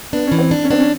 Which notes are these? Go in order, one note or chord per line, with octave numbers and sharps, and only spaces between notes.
B3 D4
E3 C#4
C4
D4
C#4
C4 D4
C#4